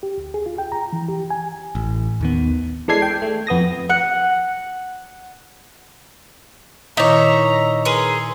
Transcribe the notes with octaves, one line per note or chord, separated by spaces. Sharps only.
G4
D2
G#4
F4
G5
A#5
E3
G4
G#5
A1
D#2 D#3 B3
E3 G#3 D4 A4 G#6 C7
G5
A3
F2 B3 D#6 A#6
F#5
A#2 D#3 D#4 E4 C#5 E5 A#5
G#4 A#4 B4 B5 C6